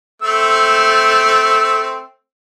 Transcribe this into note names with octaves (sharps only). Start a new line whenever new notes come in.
A3 C4 E6